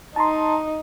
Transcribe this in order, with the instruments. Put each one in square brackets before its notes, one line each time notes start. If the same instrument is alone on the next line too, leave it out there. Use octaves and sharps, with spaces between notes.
[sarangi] D#4 [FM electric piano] A5 A#5 C6